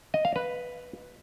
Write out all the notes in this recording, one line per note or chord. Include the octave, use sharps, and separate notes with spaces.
D#5
F5
B4